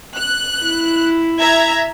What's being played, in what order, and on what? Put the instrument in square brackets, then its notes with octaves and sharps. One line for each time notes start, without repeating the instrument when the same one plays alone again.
[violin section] F#6
[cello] E4
[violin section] E5 A#5 G#6